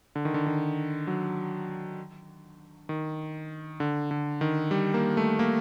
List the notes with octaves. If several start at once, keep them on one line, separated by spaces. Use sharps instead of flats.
D3
D#3
D3
D#3
F#3
D#3
D3
D3
D#3
G3
A#3
A3
A#3